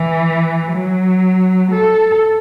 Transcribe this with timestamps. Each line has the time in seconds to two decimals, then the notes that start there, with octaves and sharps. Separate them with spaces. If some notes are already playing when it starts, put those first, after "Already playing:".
Already playing: E3
0.72 F#3
1.72 A4